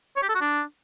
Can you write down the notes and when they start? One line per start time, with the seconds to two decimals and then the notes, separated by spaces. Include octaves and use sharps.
0.16 C#5
0.23 G4
0.29 A4
0.35 F#4
0.41 D4